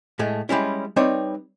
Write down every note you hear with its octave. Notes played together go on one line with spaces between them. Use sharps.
A2 G#3 A3
G3 G#3 C#4 E4
G3 C4 D#4 B4 C#5 D5